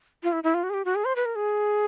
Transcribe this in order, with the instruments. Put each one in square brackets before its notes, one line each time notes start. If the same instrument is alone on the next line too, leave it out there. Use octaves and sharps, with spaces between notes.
[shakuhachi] F4
E4
E4
F4
F#4
G#4
G4
F#4
G#4
C5
B4
A#4
G#4